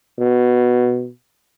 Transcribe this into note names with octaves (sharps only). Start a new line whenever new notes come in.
B2